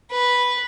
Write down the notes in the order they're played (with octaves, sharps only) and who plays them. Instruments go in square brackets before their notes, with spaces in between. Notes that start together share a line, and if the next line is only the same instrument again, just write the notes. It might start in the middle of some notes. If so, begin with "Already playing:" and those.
[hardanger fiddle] B4